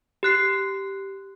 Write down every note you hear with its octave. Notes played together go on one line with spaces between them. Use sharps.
G4 F#6 C7